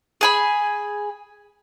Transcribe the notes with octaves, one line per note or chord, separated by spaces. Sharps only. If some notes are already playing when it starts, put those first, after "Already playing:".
G#4 G#5 B5